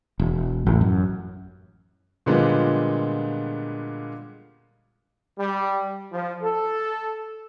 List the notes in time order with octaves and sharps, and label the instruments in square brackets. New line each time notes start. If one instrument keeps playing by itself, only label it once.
[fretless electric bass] E1
A1
F#2
[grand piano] A#2 D3 F3 G3 G#3 B3
[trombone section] G3
F3
A4